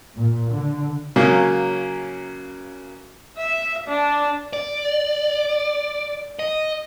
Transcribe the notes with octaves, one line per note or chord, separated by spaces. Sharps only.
A#2
D3
C#3 F#3 A#3 C#4
E5
D4
D5
D#5